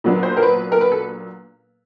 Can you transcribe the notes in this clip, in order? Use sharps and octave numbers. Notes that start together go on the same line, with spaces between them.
A#2 F#3 B3 D4
C5
A#4
B4
A#4
B4
A4